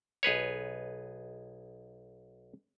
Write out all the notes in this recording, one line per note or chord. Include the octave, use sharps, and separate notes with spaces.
B1 G#4 B4 C#5